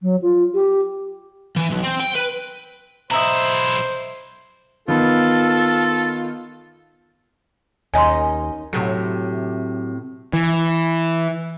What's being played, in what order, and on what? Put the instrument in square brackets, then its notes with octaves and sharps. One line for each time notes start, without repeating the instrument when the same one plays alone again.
[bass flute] F#3
F4
G4
[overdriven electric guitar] E3
B1
C4
G5
B4
[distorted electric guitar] B1 E4 [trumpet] C5 [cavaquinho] D#5 E5 A#5
[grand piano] D#3 B3 [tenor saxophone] F4 [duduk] A4
[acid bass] D#2 [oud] C#4 D#4 [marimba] G#5 C6
[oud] A2 C3 [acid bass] F#3
[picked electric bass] E3